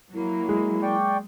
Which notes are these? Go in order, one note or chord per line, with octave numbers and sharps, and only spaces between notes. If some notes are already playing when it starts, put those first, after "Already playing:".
F#3 A#3 E4
G#3
D5 G5 C#6